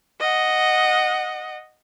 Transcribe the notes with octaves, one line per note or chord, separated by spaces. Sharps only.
D#5 F#5